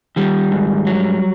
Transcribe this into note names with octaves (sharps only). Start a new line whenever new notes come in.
D#3 G3
G#2
F#3